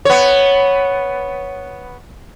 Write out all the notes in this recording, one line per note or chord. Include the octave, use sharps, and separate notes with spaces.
B3 C#5